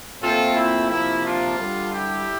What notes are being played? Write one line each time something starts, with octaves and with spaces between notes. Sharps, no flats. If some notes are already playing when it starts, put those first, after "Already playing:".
A#2 A3 C4 F4 A4
E4
C3 F3 A#3 E4
D4 F4
D3 G3 D4
E4 G4